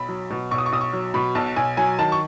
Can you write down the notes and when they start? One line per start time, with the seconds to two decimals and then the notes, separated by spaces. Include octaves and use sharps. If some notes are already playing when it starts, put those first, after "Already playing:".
Already playing: B1 B5
0.09 F#3
0.30 B2
0.51 B1 C#6
0.58 D#6
0.66 C#6
0.72 B1 D#6
0.81 C#6
0.93 F#3
1.14 B2 B5
1.35 B1 A5
1.56 B1 G#5
1.77 F#3 G#5
1.99 D#3 A5
2.12 C#6